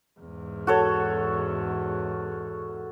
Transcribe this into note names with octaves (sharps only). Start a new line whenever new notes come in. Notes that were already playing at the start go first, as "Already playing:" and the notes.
E2 G#2
F#4 A4 C#5